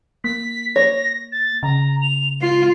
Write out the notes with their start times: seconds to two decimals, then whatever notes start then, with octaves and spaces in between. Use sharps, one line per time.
0.24 A#3 B6
0.76 C#5 A#6
1.32 A6
1.63 C#3 A#5
2.01 F7
2.42 F4 C7